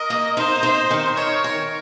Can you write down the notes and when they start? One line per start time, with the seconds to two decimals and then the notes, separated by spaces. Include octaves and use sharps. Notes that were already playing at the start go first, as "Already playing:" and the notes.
Already playing: A#4 D#5
0.10 A#3
0.37 D#4 C5
0.63 D#4
0.91 D#3
1.17 A#4 C#5
1.44 A#4